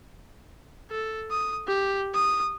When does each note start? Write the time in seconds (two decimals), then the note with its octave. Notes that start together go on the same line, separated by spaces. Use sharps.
0.91 A4
1.31 D#6
1.68 G4
2.15 D#6